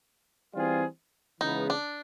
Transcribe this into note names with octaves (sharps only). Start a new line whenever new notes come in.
E3 G3 C4 F4 G#4
C#3 E3 G#3 B3 D#4
D4